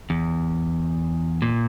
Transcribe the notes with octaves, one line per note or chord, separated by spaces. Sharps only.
E2
A#2